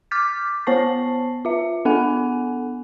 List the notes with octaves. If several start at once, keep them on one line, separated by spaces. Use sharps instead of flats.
D6 F6 G6 A6 B6
B3 C5 C#5 A5 C#6 C7
F4 E5
B3 D4 A4 F#5 G#5